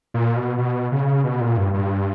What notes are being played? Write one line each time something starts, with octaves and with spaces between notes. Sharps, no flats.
A#2
B2
B2
C#3
B2
A#2
G2
G2